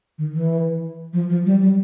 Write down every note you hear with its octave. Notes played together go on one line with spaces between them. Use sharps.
D#3
E3
F3
F3
G3
G3